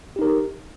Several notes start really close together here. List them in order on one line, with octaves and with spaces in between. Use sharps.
G4 D#4 A#4